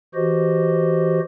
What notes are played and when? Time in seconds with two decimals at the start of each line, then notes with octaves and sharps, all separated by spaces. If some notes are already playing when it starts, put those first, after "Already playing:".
0.15 E3 F#4 G4 C5 D#5